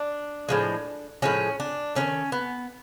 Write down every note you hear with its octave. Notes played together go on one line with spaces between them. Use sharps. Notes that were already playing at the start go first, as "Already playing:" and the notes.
Already playing: D4
A2 F3 G#3
A2 F3 G#3 C#4
D4
D#3 F#3 A3 C#4
B3